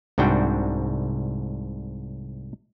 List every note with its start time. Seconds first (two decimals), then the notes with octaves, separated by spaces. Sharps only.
0.18 C2 G#2 D4 F#4 G5